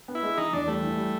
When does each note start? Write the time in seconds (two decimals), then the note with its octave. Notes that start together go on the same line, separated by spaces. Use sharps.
0.08 B3
0.15 E4
0.23 G#3
0.37 E3 D#4
0.53 E2 D4
0.68 G3 A3
0.82 E3
0.97 G3